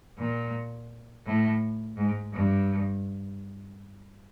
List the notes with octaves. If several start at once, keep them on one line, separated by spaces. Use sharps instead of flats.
A#2
A2
G#2
G2